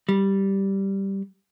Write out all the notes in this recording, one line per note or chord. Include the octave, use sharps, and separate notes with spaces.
G3